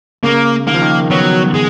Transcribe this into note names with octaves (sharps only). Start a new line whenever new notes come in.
C#3 A#3
D#3 A#3
F3
D#3
F#3 B3
G#3